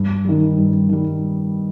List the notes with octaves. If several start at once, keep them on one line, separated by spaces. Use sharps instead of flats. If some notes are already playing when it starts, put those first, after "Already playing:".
Already playing: G2
D#3 G3
G2
D#3 G3